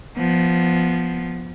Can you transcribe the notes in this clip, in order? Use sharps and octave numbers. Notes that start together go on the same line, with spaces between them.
F3 B3